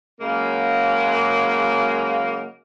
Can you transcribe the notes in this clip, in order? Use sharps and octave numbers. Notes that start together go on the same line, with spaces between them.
C#3 F#3 G#3 A#3